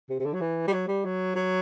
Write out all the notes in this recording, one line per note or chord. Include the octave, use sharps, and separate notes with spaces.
C3
C3
D3
F#3
E3
G3
F#3
G3
F#3
F#3